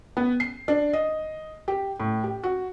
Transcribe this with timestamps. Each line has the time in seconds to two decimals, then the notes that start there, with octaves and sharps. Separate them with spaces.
0.17 B3
0.40 C7
0.68 D4
0.93 D#5
1.68 G4
2.00 A2
2.24 G4
2.43 F#4